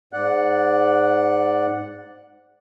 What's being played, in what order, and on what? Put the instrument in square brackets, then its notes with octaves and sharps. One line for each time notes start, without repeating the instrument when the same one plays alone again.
[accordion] G#2 D5 F#5 F#6